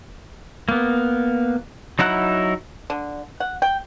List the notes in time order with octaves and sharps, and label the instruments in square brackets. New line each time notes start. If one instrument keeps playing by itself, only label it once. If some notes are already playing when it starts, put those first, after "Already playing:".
[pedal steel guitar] A#3 B3
F#3 D#4 E4 F#5 F#6
[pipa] D3
F#5
G5